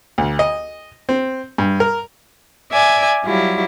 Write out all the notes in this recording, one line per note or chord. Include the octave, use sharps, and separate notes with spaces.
D2
D#5
C4
G2
A#4
D5 E5 G#5 D6
F#3 G3 E4 F4